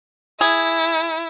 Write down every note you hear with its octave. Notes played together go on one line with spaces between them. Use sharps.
E4 G#4